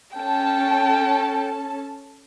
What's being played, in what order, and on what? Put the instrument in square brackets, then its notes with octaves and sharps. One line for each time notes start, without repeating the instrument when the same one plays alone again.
[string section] C#4 A4 A5 [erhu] G5